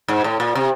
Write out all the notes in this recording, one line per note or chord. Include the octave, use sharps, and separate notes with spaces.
G#2
A2
A#2
C3